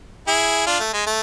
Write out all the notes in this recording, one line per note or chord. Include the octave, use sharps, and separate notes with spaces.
E4 G#4
D4 F4
A3
G#3
A3